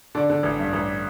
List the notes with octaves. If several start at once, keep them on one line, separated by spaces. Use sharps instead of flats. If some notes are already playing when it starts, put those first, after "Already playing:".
D3 D4
D3
A1
G2
A1